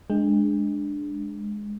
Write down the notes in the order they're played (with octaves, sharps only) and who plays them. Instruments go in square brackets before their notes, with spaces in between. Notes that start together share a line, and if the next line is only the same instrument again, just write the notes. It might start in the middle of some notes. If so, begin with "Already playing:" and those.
[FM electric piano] G#3 [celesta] D4